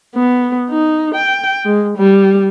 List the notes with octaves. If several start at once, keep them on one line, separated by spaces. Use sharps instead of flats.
B3
D#4
G5
G#3
G3